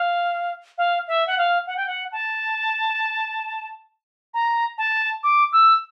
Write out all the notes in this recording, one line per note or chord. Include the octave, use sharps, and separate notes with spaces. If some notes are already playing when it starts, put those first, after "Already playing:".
Already playing: F5
F5
E5
F#5
F5
F#5
G5
F#5
A5
A#5
A5
D6
E6